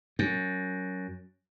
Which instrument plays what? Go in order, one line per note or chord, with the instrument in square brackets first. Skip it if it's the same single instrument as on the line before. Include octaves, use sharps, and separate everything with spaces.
[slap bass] F#2